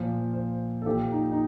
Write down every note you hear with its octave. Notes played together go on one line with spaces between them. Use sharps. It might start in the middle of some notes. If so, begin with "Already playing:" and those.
Already playing: A#2 F3
C5
A4
A#2 F3 G4
D#4
D#4